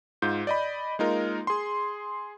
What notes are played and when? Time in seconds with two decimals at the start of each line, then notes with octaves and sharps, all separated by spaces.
0.22 G#2 F4 G6
0.47 D5 D#5 B5
0.99 G#3 A#3 D#4 F4 A#4
1.47 G#4 C6